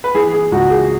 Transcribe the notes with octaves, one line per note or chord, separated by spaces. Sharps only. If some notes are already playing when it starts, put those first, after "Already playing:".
B4
E3 G#4
G#4
C#2 F#4
G#4